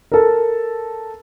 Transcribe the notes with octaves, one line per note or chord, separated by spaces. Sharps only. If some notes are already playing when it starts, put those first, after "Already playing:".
A4 A#4